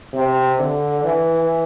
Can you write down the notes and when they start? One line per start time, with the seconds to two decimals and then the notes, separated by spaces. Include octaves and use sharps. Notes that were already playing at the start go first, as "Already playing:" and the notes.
0.14 C3
0.59 D3
1.04 E3